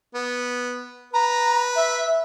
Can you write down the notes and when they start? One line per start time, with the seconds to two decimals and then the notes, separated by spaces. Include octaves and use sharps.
0.14 B3
1.14 B4 A#5
1.76 E5